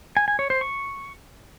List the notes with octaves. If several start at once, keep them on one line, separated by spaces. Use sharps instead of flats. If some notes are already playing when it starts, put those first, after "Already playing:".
G#5
G#5
C#5
C5
C#6